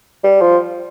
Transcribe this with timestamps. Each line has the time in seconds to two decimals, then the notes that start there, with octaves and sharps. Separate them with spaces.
0.24 G3
0.41 F3